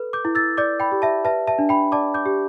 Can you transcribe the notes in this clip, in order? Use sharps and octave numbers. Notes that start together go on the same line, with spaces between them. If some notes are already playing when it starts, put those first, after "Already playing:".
Already playing: A4 B4
D6 G6
E4
E6 A6
D5 D6 G6
G5 B5
G4
E5 A5
B4 E5 A5
E5 A5
D4
G5 B5
D5 A5 D6
D6 G6
G4